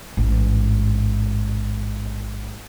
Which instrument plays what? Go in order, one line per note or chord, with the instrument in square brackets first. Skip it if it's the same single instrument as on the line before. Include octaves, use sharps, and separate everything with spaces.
[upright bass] A1 G#2